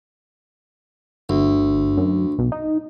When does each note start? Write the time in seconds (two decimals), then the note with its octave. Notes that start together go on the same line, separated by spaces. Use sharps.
1.29 G1 D2
1.97 F#2
2.38 B1
2.52 D#4